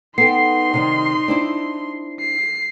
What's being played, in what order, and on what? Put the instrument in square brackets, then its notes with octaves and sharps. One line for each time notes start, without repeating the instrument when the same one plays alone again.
[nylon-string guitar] B3 A4 G5 [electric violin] D#4 C6 [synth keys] C7
[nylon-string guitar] C3 D#3 G3
C4 D4 E4
[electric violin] C7